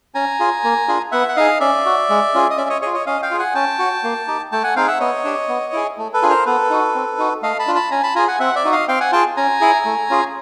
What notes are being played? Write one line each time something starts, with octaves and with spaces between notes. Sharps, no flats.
C#4 G#5 A#5
F4 G#4
A#3
D4 F4 G#4
B3 E5 F#5
F#5
D#4 G#4 D#5 F5
C#4 D5 E5
F#4
G#3
C#4 F4 G#4
D#5
C#4 D5 E5
C#5 D#5
F4 G#4 C#5 D#5
C#5 D#5
C#4 D#5 F5
F5 G5
F4 G#4
F#5 G#5
C#4 G5 A5
F#4
A#3
D#4 G4
A3 G5 A5
F#5 G#5
C4 D#4 G#4 F5 G5
E5 F#5
B3 C#5 D#5
D4 G4
B3
E4 G#4
A3
A4 B4
D4 F4 G#4
A#4 C5
B3 A4 B4
D#4 F#4
C4
D#4 F#4
A3 D#5 F5
A5 B5
D4 F4
A5 B5
C#4 G#5 A#5
A5 B5
F4 G#4 G#5 A#5
F#5 G#5
C4 E5 F#5
D5 E5
D#4 F#4
D#5 F5
C4 F5 G5
F#5 G#5
F4 G#4 G5 A5
C#4 G#5 A#5
E4 G#4
A3
C#4 F4 G#4